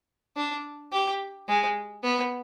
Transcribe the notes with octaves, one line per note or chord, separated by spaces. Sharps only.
D4
G4
G#3
B3